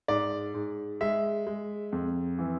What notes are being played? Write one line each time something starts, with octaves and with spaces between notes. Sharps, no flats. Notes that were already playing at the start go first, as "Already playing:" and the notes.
G#2 D5
G#2
G#3 E5
G#3
F2
E3